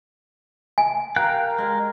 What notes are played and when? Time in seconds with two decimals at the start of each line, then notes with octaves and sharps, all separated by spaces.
0.78 G#5
1.16 A#4 F5 G5 A#5 F#6
1.58 G#3 F5